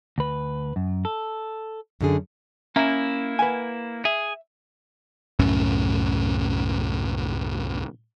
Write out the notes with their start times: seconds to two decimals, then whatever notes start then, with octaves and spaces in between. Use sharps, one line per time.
0.18 D2 B4
0.76 F#2
1.05 A4
2.01 F#2 D3 G#4
2.76 A#3 C#4 E4 E5 A#5
3.39 B4 F#5 G#5
4.05 G#4 E5
5.39 C2 F#2 A2 C#4